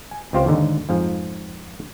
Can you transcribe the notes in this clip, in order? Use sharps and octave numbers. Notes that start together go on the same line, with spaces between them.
G#5
C#2 C4 F4 G4 C5 F5
D#2 G#2 D3 D#4
F2 G#2 F3